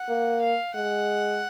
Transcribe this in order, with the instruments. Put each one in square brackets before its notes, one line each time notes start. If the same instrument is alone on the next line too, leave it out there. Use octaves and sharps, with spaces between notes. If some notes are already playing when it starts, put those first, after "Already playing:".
Already playing: [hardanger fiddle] F#5
[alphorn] A#3
[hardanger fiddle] F5
[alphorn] G#3 [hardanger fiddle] F#5